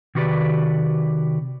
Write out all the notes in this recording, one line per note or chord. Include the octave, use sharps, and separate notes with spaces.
C3 D#3 F#4 G4 B4 D5